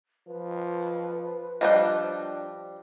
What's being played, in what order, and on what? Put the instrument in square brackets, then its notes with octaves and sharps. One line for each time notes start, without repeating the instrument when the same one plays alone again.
[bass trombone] F3 [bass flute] B4
[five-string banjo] F3 G3 G5 [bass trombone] D4 [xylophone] D#5 F#6